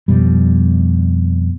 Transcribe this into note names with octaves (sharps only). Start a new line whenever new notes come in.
F2 B2 G3